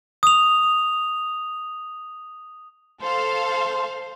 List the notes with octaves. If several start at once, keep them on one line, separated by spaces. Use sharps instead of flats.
D#6 F7
A4 C5 F5 C6